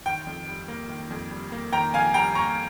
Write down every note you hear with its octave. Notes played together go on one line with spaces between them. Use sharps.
D#3 G5
F2
G3
A#3
D#3
F2
G3
A#3
D#3 G5 A#5
F2 F5 G#5
G3 G5 A#5
A#3 A#5 C#6